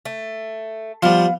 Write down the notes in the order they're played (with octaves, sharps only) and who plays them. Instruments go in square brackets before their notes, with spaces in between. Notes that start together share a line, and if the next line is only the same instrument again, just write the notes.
[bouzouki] A3
[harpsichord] F3 G3 [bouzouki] B3 F5